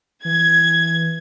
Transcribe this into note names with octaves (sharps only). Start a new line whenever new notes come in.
E3 G#6